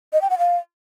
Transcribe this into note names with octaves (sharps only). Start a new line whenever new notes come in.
D#5
G5
F#5
F5